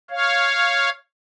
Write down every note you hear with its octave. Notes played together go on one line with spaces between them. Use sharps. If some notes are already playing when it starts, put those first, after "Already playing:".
C#5 F5